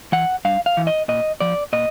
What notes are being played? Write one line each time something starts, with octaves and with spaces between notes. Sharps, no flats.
E3 F#5
G2 F5
F5
E3
D#5
A#2 D#5
F3 D5
A#2 D#5